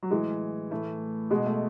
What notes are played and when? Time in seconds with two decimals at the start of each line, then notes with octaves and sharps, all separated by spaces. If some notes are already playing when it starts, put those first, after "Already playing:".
0.03 F#3
0.11 A2 E3 G#3
0.71 A2 E3 A3
1.30 B2 G#3
1.46 A3